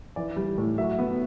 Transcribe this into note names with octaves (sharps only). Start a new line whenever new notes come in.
E3 D5
G3
A2
F#3 E5
B3